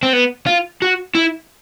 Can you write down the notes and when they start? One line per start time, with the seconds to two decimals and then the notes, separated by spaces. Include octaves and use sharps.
0.03 C4
0.13 B3
0.46 F4
0.82 F#4
1.15 E4